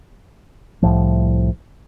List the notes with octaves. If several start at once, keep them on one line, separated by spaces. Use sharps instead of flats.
C2 A2 F3